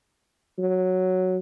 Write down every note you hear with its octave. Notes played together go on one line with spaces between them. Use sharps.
F#3